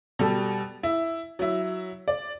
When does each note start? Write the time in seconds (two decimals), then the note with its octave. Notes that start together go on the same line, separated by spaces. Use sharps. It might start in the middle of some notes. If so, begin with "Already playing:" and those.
0.19 B2 G3 A4
0.83 E4
1.39 F#3 E4
2.08 D5